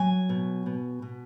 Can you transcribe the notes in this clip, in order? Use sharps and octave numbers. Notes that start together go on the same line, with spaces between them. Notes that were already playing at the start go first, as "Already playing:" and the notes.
Already playing: F#3 G#5
B2
B2
B2